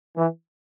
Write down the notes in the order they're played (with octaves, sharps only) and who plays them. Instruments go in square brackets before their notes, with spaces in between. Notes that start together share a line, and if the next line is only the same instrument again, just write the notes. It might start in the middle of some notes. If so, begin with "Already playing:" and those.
[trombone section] E3